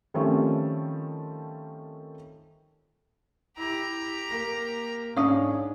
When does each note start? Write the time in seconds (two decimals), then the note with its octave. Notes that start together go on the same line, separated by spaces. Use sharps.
0.14 D#3 F3 G3 A3 C4 C#4
3.58 E4 G4 A#5
4.30 A#3
5.17 G#2 C#4 D4 C#5 F5 D#6